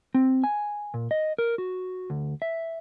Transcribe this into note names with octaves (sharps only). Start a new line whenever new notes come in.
C4
G#5
A#2
D#5
A#4
F#4
D2
E5